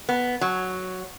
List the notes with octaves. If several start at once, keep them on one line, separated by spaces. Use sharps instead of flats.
B3
F#3